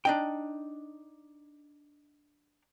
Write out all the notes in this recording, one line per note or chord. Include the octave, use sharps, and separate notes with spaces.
D4 D#4 G5